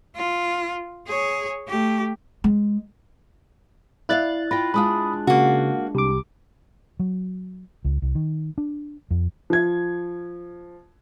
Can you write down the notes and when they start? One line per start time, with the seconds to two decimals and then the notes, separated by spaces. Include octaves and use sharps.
0.15 F4
1.06 G#4 C#5
1.67 A3 G4
2.44 G#3
4.09 E4 D5 E5 F5 F#6 A6
4.51 F4 G5 B5 A#6
4.74 G#3 D4 F4 B5 D#6
5.27 C#3 A#3 F#4
5.95 C2 G4 D6
7.00 F#3
7.85 C#2
8.02 C2
8.15 D#3
8.58 D4
9.11 F2
9.50 F3 G#6